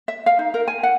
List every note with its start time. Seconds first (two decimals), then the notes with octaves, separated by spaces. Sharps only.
0.08 E5
0.26 F5
0.39 D#4
0.54 A#4
0.68 G#5
0.83 F#5